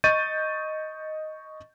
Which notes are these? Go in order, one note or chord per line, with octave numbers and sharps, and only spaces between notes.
D#5 C#6 G6 A6 D#7